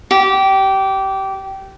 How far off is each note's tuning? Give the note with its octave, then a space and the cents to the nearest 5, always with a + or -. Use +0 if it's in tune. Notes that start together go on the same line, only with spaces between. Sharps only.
G4 -20